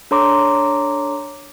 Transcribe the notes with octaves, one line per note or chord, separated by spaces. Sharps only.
D4 A4 C#5 A#5 C6 D6